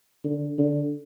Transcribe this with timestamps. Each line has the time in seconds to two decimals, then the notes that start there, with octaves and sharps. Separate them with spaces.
0.24 D3
0.58 D3